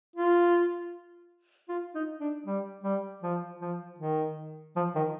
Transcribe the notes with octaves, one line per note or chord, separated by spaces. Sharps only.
F4
F4
D#4
D4
G3
G3
F3
F3
D#3
F3
D#3